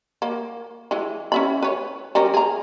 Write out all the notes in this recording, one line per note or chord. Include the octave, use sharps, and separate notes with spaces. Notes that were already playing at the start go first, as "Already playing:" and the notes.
A#3
E3 G#3
C#4 E5 B5
B4 C#5
G3 C#4 A#4
G#4 A#5